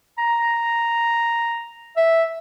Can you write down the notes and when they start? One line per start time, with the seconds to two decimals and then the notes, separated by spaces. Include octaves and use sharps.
0.18 A#5
1.97 E5